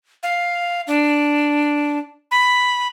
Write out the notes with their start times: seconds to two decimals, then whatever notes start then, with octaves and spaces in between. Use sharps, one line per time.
0.23 F5
0.87 D4
2.31 B5